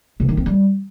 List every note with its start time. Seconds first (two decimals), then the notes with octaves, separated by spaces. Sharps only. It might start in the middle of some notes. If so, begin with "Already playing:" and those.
0.20 C3
0.29 D#3
0.37 C4
0.46 G3